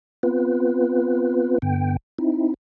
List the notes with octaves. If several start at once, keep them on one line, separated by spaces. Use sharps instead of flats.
B3 C4 F4 B4
G2 D3 B3 G5
C4 D#4 E4